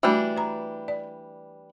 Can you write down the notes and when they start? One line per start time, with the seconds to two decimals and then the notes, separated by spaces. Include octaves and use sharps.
0.03 E3 G3 A3 D4 F#4
0.37 B4 A#5
0.88 D5